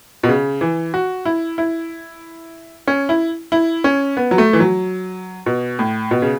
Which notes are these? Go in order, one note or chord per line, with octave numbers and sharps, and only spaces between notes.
B2
C#3
E3
F#4
E4
E4
C#4
E4
E4
C#4
B3
F#3
A3
E3
F#3
B2
A2
B2
C#3